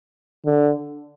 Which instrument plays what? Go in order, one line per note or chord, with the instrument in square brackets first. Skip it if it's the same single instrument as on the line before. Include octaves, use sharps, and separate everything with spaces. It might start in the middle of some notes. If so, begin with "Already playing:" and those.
[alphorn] D3